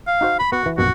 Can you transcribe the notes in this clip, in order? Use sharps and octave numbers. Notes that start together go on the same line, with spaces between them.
F5
D#4 F#4 C5
B5
B3 F#4
E3
A#1 F#2 B2 F#4